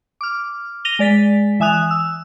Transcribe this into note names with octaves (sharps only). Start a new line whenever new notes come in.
D6 F6
A#6 D#7 F7 G7
G#3 D5 A6 B6
E3 E5 G#5 D#6 F#6 F7
E6